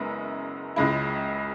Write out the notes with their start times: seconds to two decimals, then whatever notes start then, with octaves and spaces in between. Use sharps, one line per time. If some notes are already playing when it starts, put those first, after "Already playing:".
Already playing: F#1 F#2 C#3 G#3 B3
0.76 C#2 C#3 G#3 E4